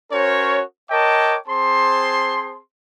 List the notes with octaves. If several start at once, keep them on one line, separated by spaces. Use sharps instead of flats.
C#4 F#4 A#4 C5 C#5
A#4 C#5 D#5 G5 A5 D6
C4 G#4 C5 A5 C6